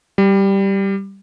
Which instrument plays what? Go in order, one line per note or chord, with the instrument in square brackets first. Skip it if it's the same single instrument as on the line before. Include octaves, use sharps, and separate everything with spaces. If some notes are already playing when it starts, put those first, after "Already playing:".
[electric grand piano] G3